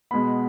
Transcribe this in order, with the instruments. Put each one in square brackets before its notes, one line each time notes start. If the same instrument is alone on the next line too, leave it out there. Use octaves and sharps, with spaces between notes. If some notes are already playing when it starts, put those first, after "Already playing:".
[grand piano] B2 G#3 B3 B5